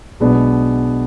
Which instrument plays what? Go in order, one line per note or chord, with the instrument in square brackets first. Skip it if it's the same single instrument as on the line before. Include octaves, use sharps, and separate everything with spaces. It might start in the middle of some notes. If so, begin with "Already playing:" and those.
[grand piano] B1 B2 G#3 B3 D4